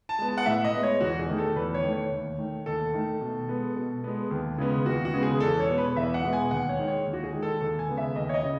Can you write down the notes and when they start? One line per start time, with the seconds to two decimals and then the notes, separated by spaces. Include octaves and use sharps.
0.09 A5
0.19 G#3 B3
0.28 A5
0.38 F#5
0.46 A2 E5
0.64 D#5
0.74 G#3 B3
0.83 C#5
1.01 E2 F#4
1.19 G#4
1.29 D#3 A3
1.38 A4
1.56 E2 B4
1.74 C#5
1.83 D#3 A3
1.92 C#5
2.11 D#2
2.38 D#3 A3
2.66 D#2 A4
2.94 D#3 A3
3.21 B2
3.49 G#3 B3
3.76 B2
4.04 G#3 B3
4.31 D#2
4.58 C#3 G#3 B3
4.86 D#2 F#4
5.05 F#4
5.13 C#3 G#3 B3
5.23 G#4
5.40 E2 A4
5.60 C#5
5.68 B2 G#3 B3
5.78 B4
5.96 E2 E5
6.14 F#5
6.24 B2 G#3 B3
6.33 G#5
6.51 D#2 F#5
6.69 C#5
6.79 D#3 G#3
6.88 C#5
7.06 D#2
7.13 F#4
7.24 G#4
7.33 D#3 G#3
7.42 A4
7.61 D#2 A4
7.79 G#5
7.88 C#3 G#3 B3
7.98 E5
8.16 D#2 D#5
8.29 C#5
8.34 D#5
8.43 C#3